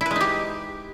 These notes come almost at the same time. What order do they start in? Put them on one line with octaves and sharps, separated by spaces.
E4 B4 G#3 D#4 G4